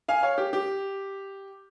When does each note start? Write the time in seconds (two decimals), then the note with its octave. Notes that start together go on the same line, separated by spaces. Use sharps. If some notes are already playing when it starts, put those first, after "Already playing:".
0.08 F5 G#5
0.23 C#5 F5
0.38 G4
0.53 G4